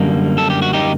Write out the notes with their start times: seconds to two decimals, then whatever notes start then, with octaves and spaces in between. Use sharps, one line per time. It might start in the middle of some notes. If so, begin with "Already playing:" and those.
Already playing: F#2 D3 G3 A#3
0.38 A4
0.50 G4
0.62 F#4
0.73 D#4 G4